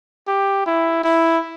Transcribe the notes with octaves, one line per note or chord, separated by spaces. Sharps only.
G4
E4
E4